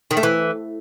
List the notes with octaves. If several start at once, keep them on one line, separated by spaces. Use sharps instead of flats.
D#3
A3
E3